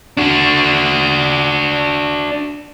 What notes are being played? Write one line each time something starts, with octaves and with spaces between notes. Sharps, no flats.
D4 F#4